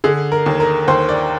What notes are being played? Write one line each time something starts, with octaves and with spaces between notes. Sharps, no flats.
D3 G#4
A#4
D#2
A#4
D#2 C5
D5